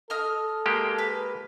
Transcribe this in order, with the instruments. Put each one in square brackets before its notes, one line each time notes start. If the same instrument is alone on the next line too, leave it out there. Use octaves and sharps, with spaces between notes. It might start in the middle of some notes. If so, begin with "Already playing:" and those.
[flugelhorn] A4 [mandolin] D#5 F6
[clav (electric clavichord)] G#3 A#3 G4
[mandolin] B4